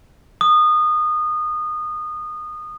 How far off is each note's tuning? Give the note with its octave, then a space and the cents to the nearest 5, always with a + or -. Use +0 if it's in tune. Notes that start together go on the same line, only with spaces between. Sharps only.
D#6 -25